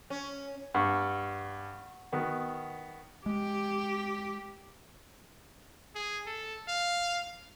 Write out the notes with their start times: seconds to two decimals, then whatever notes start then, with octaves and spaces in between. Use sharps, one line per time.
0.10 C#4
0.74 G2 F#5 C#6
2.12 D#3 B3 F#4
3.26 G#3 G4
5.95 G#4
6.26 A4
6.68 F5